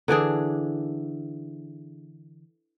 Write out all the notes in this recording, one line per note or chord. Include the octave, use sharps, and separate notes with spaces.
D3 E3 D4 G#4